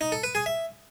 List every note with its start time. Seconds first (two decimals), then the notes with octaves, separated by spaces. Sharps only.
0.01 D#4
0.12 A4
0.23 B4
0.35 G#4
0.46 E5